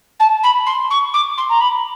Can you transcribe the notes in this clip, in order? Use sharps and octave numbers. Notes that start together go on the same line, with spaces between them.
A5
B5
C6
C#6
D6
C6
A#5
B5